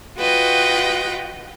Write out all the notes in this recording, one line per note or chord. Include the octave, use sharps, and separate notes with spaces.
F4 F#4 B4 D#5 G5